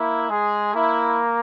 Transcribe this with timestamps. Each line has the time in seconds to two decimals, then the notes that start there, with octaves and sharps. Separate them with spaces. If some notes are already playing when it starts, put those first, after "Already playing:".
Already playing: A#3 E4
0.29 G#3 G#4
0.74 A#3 E4